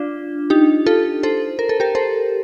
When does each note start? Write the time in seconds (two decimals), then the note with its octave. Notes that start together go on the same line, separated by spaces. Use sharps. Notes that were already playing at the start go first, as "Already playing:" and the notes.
Already playing: D4 F4
0.50 D#4 G4
0.86 F4 A4
1.23 A4 C5
1.59 A#4
1.69 A4
1.80 G4 A#4
1.95 A4 C5